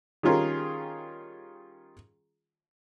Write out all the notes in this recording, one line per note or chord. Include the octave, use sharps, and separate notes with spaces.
D#3 G3 C#4 F4 G#4 A#4